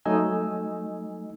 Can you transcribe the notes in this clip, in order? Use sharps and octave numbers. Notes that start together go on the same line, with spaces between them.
F#3 A3 D#4 D#5 G#5 E6